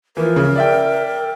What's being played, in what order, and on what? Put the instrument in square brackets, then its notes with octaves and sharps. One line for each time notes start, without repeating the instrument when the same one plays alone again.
[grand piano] E3 F3 [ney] A#4
[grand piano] C#3
D5 E5 G5